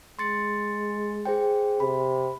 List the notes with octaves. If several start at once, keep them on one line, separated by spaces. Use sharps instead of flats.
G#3 C6 A6 C#7
G#4 C5 G5
C3 B5